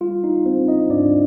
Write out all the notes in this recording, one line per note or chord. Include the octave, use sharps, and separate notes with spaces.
G3 F4
D#4
C4 D4 C5
D#4 D#5
G#2 D4 D5